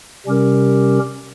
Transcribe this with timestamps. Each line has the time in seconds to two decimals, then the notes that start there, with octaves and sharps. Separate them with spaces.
0.26 C3 G3 C#4 G4 A#4